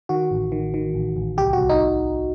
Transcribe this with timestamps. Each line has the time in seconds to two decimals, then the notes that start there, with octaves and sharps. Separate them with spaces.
0.09 D#3 F#4
0.31 A1
0.52 D#3
0.74 D#3
0.94 A1
1.16 A1
1.37 C2 G4
1.53 F#4
1.58 C2
1.69 D#4